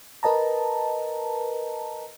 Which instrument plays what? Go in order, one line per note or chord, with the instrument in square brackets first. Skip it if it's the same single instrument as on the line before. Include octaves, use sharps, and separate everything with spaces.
[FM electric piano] A#4 B4 D#5 A5 A#5